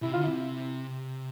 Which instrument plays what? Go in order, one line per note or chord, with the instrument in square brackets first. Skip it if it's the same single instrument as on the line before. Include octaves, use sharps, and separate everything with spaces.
[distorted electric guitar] C3 [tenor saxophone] E4
[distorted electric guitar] D3 [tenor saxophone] F4
[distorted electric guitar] C3 [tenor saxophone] E4